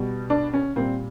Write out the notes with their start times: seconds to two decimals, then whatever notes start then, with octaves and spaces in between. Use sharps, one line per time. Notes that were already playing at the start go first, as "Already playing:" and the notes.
Already playing: B2 G3
0.30 D4
0.53 C#4
0.76 A#2 G3 C4